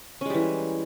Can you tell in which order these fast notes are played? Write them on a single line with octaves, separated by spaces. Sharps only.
C#4 G#3 G3 E3